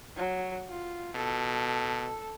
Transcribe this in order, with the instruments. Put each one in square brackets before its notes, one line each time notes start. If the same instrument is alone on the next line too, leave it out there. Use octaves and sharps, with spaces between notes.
[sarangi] F#3
F4
[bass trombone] B2 [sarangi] A4